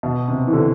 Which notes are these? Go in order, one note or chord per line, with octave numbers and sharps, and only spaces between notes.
B2
C3
E3
D3